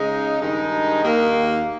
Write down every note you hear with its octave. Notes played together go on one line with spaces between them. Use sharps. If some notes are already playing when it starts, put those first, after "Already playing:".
Already playing: C#3 G#3 D#4
G2 D#3 G#3 D#4
D#2 D#3 A#3